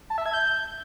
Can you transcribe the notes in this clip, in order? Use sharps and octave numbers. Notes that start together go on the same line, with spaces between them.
A5
E5
G#6
G6